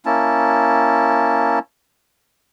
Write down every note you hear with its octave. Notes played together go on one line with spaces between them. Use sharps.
A#3 C#4 E4 A5